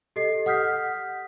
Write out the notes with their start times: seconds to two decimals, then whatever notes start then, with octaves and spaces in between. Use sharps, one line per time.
0.16 G4 A4 D#5 C7
0.46 F#5 D#6 F6 G6 B6